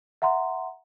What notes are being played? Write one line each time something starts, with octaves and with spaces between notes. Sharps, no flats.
E5 F#5 A#5 C6